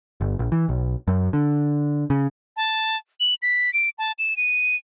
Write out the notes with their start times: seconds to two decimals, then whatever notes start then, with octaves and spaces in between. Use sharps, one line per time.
0.21 G1
0.39 A#1
0.52 E3
0.69 B1
1.08 F#2
1.33 D3
2.10 C#3
2.57 A5
3.20 F#7
3.42 B6
3.74 D7
3.98 A5
4.19 E7
4.37 D#7